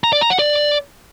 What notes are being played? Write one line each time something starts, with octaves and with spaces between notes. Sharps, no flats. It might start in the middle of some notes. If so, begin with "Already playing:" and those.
A#5
D5
A#5
F#5
D5